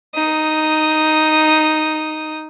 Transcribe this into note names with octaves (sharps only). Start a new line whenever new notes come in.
D#4 D#6